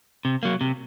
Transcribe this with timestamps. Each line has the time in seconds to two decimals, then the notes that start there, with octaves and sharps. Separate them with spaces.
0.25 C3
0.43 F#3 A#3
0.61 C3